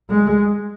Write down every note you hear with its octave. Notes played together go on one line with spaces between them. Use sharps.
G#3